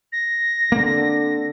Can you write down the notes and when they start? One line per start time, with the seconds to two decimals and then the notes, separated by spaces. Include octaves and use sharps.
0.12 A#6
0.72 D3 A#3 C4